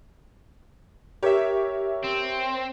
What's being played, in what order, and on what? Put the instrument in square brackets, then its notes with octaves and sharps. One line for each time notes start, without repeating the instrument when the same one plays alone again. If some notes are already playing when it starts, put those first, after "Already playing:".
[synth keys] G4 E5 [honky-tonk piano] A#4 C#5
[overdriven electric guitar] C4